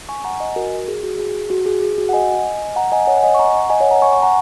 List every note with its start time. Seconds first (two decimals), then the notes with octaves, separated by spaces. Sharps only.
0.09 G#5 C#6
0.24 F#5 A#5
0.40 D#5 G#5
0.56 F#4 A#4
0.88 G#4
1.03 F#4
1.19 G#4
1.50 F#4
1.66 G#4
1.82 G#4
1.98 F#4
2.09 F#5
2.13 D#5 G#5
2.76 F#5 A#5
2.92 D#5 G#5
3.07 C#5 F#5
3.23 D#5 G#5
3.35 C#6
3.39 F#5 A#5
3.70 D#5 G#5
3.80 C#5 F#5
3.91 F#5 A#5
4.02 G#5 C#6
4.13 G#5 C#6
4.23 F#5 A#5